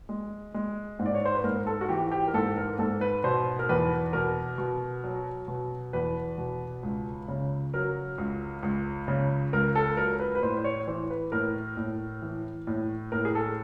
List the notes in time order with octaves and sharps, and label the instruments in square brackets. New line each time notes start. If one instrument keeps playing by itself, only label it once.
[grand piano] G#3
G#3
G#2
D5
C#5
C5
B4
G#2 A#4
A4
F#4
E3 G4
G4
A#4
G#2 A4
A#4
G#2 A4
B4
B2 C5
A#4
E2 B4
B2 A#4
B2
F#3
B2
E2 B4
B2
C#2
C#3
F#3 A#4
C#2
C#2
C#3
C#2 A#4
A4
F#3 A#4
B4
B4
A2 C5
C5
C#5
E3 C5
B4
A2 A#4
A2
E3
A2
A2 A#4
G#4
A4